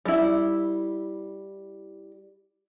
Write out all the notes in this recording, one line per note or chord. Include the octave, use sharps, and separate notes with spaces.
G3 E4